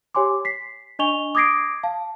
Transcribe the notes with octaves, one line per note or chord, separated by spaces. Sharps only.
G4 C#5 G#5 C6 D6
B6 C7
D4 D#5 G#5 C#6 F7 G7
D6 D#6 G#6 A#6 C7 D7
F5 A5